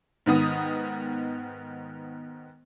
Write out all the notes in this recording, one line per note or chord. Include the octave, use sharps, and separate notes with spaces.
G#2 D#3 B3 D#6